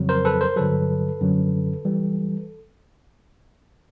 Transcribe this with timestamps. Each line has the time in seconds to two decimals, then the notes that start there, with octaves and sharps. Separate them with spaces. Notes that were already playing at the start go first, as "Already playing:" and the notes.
Already playing: F2 C#3 F#3
0.09 A#4 C5
0.25 A4 B4
0.41 A#4 C5
0.56 G2 D3 F#3 A4 B4
1.21 F#2 D3 F#3
1.85 E3 G3